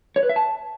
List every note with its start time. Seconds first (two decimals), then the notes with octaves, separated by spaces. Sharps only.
0.16 C#5
0.23 B4
0.29 E5
0.36 A5